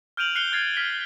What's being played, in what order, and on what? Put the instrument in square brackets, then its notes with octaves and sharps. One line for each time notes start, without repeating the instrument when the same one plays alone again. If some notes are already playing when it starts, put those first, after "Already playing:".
[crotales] F6 G6 D7 D#7 F7 F#7
F6 F#6 C7 C#7 F7 G7
F6 G#6 A6 C7
F6 B6 G7